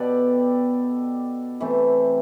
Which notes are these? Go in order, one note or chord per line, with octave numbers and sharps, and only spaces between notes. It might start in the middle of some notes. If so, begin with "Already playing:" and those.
Already playing: B2 B3 G4 A4 B4 D5
C3 E3 A3 C4